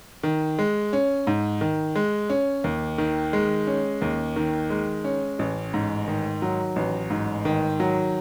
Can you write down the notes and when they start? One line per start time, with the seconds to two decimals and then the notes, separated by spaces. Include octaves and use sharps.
0.23 D#3
0.59 G#3
0.93 C#4
1.27 G#2
1.61 D#3
1.96 G#3
2.30 C#4
2.64 D#2
2.98 D#3
3.33 G#3
3.67 C#4
4.02 D#2
4.36 D#3
4.70 G#3
5.04 C#4
5.39 A1
5.74 G#2
6.08 D#3
6.42 F#3
6.76 A1
7.10 G#2
7.45 D#3
7.80 F#3